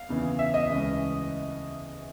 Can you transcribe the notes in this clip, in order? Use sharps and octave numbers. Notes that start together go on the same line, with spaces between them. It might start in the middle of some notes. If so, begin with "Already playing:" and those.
Already playing: F5
E2 C#3 E3
E5
D#5
D2 C#3 E3 G#3 C#4